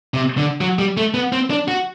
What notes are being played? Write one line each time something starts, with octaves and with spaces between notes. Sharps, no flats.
C3
D3
F#3
G3
A3
B3
C4
D4
F#4